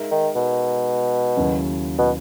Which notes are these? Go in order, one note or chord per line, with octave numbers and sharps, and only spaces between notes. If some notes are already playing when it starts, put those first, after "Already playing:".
Already playing: G#3 D#4 A#4 E5
D#3
B2
D#2 C#3 F#3 C#4 E4
B2